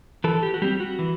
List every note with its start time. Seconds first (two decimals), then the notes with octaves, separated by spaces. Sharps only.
0.24 E3 A4
0.43 G4
0.54 F#4
0.62 G3 C4 G4
0.80 F#4
0.99 E3